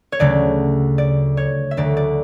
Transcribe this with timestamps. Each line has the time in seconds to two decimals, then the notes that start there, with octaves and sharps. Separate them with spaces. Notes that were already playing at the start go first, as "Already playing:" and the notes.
0.12 C#5
0.19 D2 C#3 F#3 A3 D5
0.98 D5
1.37 C#5
1.71 E5
1.77 D2 D3 F#3 D5
1.97 D5